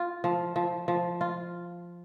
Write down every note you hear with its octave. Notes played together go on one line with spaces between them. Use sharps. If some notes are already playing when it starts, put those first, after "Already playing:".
Already playing: F4
F3
F3
F3
F4